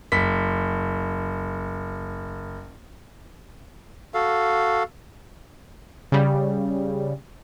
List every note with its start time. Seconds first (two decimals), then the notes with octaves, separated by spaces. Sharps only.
0.12 F#1 B6
4.14 F#4 A4 F5
6.12 C#3 G3